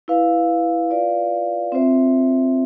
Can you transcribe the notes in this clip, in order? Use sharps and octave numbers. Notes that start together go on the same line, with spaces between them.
E4 B4 F5
F4 B4 D5 F5
C4 F4 C5 E5